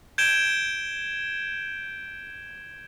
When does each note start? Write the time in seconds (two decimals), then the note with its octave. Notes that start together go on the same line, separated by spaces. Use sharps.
0.18 G6 G#6 D7 E7 G7